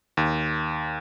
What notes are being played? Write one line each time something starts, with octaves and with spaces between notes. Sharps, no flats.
D#2